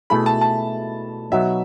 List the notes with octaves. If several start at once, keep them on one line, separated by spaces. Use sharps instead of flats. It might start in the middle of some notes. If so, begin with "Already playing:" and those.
B2 A3 E4 G#4 B5
A5
A5
B2 F#3 B3 D#4 F#4 E5